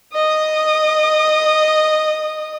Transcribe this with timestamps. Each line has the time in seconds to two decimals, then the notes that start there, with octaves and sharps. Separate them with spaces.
0.14 D#5 D#6